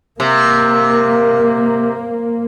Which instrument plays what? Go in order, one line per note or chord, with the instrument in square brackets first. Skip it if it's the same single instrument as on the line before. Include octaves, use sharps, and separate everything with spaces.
[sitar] C3 [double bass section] A#3